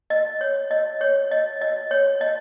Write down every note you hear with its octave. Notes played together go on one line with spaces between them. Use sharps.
D#5
C#5
D#5
C#5
D#5
D#5
C#5
D#5